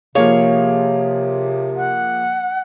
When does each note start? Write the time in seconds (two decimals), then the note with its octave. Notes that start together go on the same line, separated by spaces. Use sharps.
0.15 C3 F3 A#3 G#4 C#5 F5
1.76 F#5